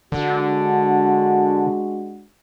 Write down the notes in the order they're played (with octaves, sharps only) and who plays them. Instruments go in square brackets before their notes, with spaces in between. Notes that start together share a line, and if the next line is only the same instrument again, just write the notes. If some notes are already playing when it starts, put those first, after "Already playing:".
[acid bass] D3 [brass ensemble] G#3 D4 F#4